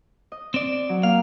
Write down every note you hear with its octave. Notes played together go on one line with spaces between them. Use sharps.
D#5
C4 D5
F#3
A#3 F5